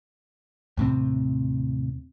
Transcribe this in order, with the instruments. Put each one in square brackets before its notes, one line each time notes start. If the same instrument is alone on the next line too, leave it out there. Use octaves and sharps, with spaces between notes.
[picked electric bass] D#2 A2 C3 C4